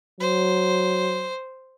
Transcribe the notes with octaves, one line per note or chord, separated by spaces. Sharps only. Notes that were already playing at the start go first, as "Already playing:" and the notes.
F#3 C5